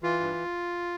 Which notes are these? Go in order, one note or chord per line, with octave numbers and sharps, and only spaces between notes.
E3 F4
G2